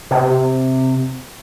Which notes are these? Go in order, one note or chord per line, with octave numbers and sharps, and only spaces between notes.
C3